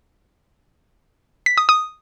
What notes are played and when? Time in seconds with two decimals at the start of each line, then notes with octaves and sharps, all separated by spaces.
1.46 B6
1.58 D#6
1.69 D#6